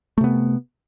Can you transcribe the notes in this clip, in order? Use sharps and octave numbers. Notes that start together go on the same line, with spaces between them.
C3 A3 B3